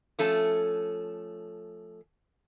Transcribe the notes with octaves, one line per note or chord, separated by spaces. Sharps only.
F3 A3 C#4 A4